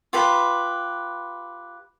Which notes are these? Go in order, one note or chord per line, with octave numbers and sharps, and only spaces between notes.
F4 G4 B4 B5